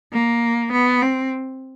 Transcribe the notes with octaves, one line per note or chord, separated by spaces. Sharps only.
A#3
B3
C4